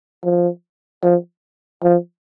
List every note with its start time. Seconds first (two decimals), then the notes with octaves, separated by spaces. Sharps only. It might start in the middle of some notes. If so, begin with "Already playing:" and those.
0.24 F3
1.03 F3
1.84 F3